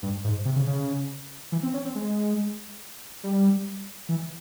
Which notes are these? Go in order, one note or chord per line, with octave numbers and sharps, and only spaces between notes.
G2
G#2
C3
C#3
C#3
E3
C4
C#4
C4
G#3
G3
E3